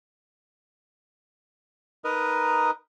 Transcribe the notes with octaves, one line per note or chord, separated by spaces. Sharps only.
D#4 A#4 B4 D#5